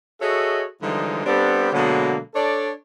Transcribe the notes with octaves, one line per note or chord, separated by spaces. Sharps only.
F#4 G#4 A4 C#5 D#5 E5
D3 E3 F3 G3 G#3 D#4
G3 B3 C4 D4 G4 A4
B2 D3 F#3 G#3 A#3 B3
D4 A4 C#5 D5